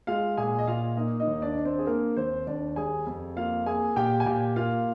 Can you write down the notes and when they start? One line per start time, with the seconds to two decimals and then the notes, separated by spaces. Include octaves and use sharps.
0.07 G#3 F4 F5
0.37 A#2 G#4 G#5
0.59 D#5
0.67 A#2 F4 F5
0.97 A#3 D#4 D#5
1.20 D#4 D#5
1.27 D#2
1.42 D4 D5
1.57 D4
1.65 C4 C5
1.79 G#4
1.87 A#3 A#4
2.16 D#2 C4 C5
2.47 D#2 D4 D5
2.76 G3 G#4 G#5
3.07 F2
3.36 A#3 F4 F5
3.66 A#3 G#4 G#5
3.96 A#2 G4 G5
4.20 G#5
4.26 A#2 G4 G5
4.56 A#3 F4 F5